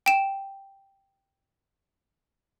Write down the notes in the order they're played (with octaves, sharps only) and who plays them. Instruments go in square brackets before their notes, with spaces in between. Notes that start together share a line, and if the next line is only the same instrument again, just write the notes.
[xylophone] G5 E7